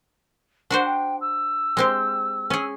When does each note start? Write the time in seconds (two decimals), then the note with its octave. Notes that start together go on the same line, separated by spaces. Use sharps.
0.70 D4 F#4 C5 F#5
0.85 G5
1.20 E6
1.77 G#3 C4 G4
2.50 C#4 G#4